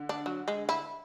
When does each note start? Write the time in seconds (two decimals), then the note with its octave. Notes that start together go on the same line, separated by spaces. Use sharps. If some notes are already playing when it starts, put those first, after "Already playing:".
Already playing: D3
0.09 D4
0.26 F#3
0.48 G#3
0.69 E4